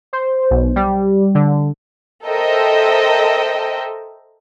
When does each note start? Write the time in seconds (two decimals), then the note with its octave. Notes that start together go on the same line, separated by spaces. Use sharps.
0.13 C5
0.51 B1
0.76 G3
1.35 D3
2.24 A4 A#4 C5 D#5 E5 G5